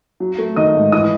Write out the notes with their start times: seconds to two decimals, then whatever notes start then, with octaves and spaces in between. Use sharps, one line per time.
0.20 F#3
0.38 A3
0.56 D#3 D#5 D#6
0.75 G#2
0.92 E3 D#5 D#6